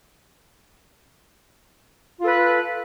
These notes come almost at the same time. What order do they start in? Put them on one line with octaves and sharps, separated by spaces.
F4 A4 B4